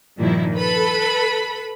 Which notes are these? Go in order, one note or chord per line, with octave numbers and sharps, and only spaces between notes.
G2 A#2 D#3 F3 E4
A4 B4 B5